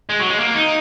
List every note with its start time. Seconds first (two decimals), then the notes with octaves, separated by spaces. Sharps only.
0.09 G#3
0.19 F#3
0.29 G#3
0.39 A#3
0.54 D#4